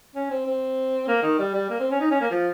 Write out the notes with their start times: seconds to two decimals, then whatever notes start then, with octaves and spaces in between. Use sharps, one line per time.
0.15 C#4
0.31 C4
0.46 C4
1.08 A#3
1.23 D#3
1.39 G3
1.54 G3
1.70 A#3
1.80 C4
1.91 C#4
2.00 D#4
2.11 C#4
2.21 A#3
2.31 F3